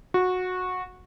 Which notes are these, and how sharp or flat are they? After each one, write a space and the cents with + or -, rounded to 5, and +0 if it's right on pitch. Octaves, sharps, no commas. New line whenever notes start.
F#4 -15